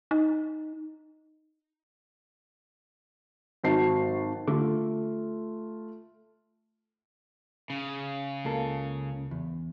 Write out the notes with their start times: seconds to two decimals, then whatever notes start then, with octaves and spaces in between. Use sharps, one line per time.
0.11 D#4
3.64 G#1 F#3 A5 C7
4.48 D3 A3 F4
7.70 C#3
8.45 C#2 A#3 A4
9.31 E2